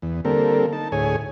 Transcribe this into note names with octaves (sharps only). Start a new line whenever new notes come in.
E2
D3 G3 A#3 C4 A4 A#4
D#4 A5
D2 A2 G#4 C#5 G#5